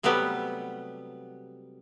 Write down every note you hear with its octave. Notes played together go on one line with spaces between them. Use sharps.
C3 F#3 G3 A3 B3 G4